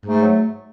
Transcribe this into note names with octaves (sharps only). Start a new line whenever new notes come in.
G#2 A3
F#3